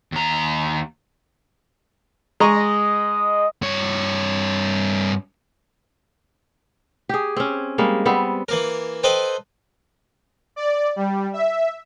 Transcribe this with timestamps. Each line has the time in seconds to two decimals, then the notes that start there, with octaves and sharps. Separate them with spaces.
0.12 D#2 A#5
2.40 G#3 D#5 A#5 C#6
3.62 G2 C#5
7.09 G4 G#4
7.36 C4 C#4
7.78 G3 G#3 A#3
8.05 G3 B3 C4
8.48 E3 A#3 A#4
9.03 A4 B4 C5 D#5 G5
10.56 D5
10.96 G3
11.33 E5